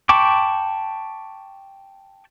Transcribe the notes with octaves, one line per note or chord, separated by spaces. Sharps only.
G5 A5 B5 C#6 D6